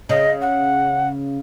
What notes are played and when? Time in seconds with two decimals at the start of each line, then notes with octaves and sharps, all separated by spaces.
0.09 C#3 D#5
0.41 F#5